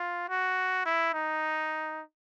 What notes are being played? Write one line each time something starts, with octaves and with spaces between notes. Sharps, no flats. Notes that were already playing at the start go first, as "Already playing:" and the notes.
Already playing: F4
F#4
E4
D#4